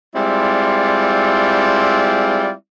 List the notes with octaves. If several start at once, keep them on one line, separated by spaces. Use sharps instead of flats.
G3 G#3 C4 E4 F4 D5